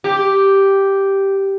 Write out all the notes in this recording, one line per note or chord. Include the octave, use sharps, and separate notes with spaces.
G4